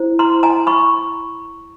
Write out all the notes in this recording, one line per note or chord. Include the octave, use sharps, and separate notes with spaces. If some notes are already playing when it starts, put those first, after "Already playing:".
Already playing: E4 C5
A#5 C6
G#5 A#5
B5 C#6